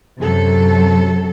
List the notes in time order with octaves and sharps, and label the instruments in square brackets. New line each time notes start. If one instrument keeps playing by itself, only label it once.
[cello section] F#2 C3 F#3 A4